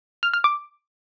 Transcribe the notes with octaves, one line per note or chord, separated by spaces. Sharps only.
F6
F6
D6